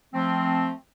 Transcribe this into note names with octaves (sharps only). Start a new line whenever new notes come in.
F3 A3 C4